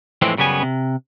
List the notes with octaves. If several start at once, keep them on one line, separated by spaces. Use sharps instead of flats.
F2 A2 E3 G#3 C4 D4
F#2 C#3 G3 B3 G#5
C3